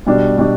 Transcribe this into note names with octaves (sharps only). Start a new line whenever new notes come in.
B2 G3 D4
B2 G3 D4